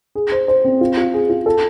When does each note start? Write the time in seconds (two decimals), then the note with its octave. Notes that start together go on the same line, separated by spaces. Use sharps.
0.15 G#4
0.32 C5
0.48 C5
0.65 C4
0.81 F4
0.97 F4
1.14 G#4
1.29 F4
1.46 A4